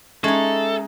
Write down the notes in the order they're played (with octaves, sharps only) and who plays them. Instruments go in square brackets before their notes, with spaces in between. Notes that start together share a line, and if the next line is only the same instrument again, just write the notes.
[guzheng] G#3 D#4 [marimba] C#4 G#6 [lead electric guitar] A4 [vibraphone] E5